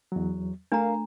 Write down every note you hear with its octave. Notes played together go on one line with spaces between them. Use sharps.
E2 F#3
A3 D4 A#4 F5 A#5